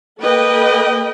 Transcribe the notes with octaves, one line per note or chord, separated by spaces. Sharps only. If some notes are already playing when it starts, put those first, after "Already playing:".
A#3 A4 B4 D#5 G5